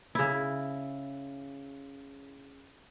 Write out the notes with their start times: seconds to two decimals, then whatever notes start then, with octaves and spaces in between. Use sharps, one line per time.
0.15 C#3 E4